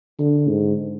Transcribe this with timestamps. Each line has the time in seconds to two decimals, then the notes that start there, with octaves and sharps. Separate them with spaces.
0.19 D3
0.49 G#2